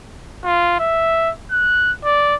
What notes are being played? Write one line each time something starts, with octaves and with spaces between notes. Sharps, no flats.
F4
E5
F#6
D5